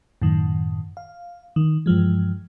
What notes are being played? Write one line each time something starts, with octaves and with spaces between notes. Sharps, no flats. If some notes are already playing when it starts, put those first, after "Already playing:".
F#2 A2 D#3
F5
D#3
G2 E3 F3 G#3